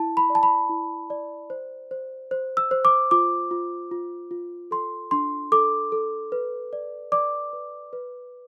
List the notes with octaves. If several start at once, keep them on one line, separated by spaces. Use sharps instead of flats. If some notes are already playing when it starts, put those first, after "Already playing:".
Already playing: E4 A5
B5
D5
A5
B5
E4
D5
C5
C5
C5
E6
C5
D6
F4 D6
F4
F4
F4
A4 C6
D4 C6
A4 D6
A4
B4
D5
D5 D6
B4
B4